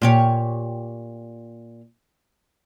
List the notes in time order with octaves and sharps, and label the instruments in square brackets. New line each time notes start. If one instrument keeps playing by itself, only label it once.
[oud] A#2 G4 C#5